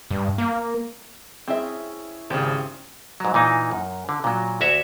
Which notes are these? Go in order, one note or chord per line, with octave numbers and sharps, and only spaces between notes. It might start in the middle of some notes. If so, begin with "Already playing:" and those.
G2
A#3
C4 C#4 E4 G#4 E5
G#1 C#3 C4 G4
G#2 F#3
A#2 E3 D#4
F#2
D3
A#2 F#3
D2 F#4 C#5 E5